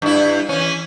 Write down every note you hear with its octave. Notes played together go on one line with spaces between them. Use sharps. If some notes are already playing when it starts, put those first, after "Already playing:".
G2 E4
E3 C#4